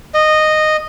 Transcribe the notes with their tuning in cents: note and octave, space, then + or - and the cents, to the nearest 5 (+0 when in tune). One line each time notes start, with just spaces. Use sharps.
D#5 -10